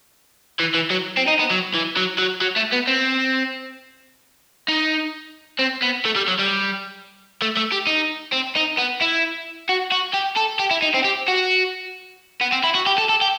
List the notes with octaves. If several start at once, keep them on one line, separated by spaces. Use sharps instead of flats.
E3
E3
F#3
C4
D#4
B3
F#3
E3
F#3
F#3
F#3
A3
B3
C4
D#4
C4
B3
A3
G3
F#3
G3
A3
A3
G4
D#4
C4
D#4
B3
E4
F#4
F#4
G4
A4
G4
E4
D#4
C4
G4
F#4
B3
C4
E4
F#4
G4
A4
A4
G4